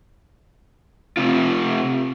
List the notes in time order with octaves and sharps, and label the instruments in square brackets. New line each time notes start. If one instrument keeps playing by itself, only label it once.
[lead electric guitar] C3 F4